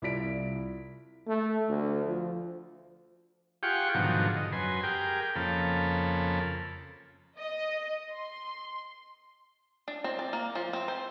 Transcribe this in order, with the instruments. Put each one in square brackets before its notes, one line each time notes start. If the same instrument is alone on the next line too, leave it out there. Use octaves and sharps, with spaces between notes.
[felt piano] C2 E4 F4 D5 B6 D7
[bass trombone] A3
D2
F3
[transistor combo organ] F4 G4 G#4 F#5 G5 C#6
G#2 B2 D3 D#3 F3 F#3
D#5
F#2 B4 G#5 C6
G4 G#4 A#4 G5
F2 C#3 A#3 A4 B5
[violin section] D#5
C6
[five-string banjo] D4
C4
D5
A#3
F3
C4
C5